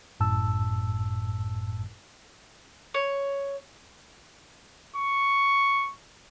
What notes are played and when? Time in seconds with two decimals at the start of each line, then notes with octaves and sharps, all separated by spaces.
0.20 G1 F#2 A2 A5 E6
2.94 C#5
4.96 C#6